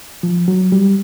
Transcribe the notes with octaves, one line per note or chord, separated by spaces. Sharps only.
F3
F#3
G3